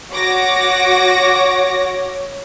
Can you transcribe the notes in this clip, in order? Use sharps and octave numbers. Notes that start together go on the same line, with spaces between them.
F#4 C#5 D6 A#6